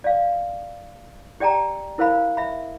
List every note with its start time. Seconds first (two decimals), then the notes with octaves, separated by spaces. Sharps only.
0.04 D5 F5
1.40 G4 D5 G5 A5 A#5
1.98 E4 A#4 C5 F5 B5
2.37 E5 B5